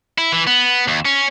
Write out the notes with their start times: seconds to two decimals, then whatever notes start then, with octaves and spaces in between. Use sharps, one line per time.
0.18 E4
0.32 E3
0.47 B3
0.88 D#2
1.05 C#4